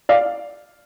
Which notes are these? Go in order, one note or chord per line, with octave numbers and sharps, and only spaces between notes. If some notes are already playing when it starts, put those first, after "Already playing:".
D5 F5